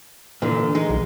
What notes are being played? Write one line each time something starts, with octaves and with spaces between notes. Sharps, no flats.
A#2 D3 E3
G#3 D#4
B1